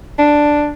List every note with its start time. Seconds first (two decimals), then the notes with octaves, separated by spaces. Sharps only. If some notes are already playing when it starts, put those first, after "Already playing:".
0.19 D4